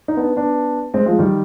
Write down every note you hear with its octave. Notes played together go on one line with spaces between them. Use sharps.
D#4
B3 D4
B3 D4
G#3 C4
F3 G#3
D#3 G3